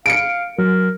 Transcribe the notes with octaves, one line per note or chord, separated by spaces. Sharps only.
F5 C#7 D7
F#3 A#4